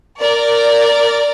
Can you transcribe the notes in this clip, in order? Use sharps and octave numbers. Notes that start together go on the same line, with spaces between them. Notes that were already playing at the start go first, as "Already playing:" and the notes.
A#4 D5